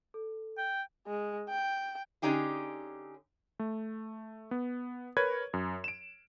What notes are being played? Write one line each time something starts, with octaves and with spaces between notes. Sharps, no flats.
A4
G5
G#3
G5
D3 C#4 D#4 G4 G#4
A3
B3
A#4 B4 C#5 G#6
F#2
D7 E7